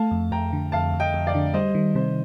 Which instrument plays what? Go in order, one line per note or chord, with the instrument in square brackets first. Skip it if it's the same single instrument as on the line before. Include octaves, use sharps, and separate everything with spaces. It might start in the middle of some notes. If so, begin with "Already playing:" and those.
Already playing: [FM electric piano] A3 [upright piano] F5 A5
[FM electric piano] F2
[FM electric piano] F2 [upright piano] G5 A#5
[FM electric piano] D3
[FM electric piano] F2 [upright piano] F5 A5
[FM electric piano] F2
[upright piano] D#5 G5
[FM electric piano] F2
[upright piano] D5 F5
[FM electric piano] D3
[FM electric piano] G3 [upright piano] C5 D#5
[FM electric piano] D#3
[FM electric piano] C3 [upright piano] C5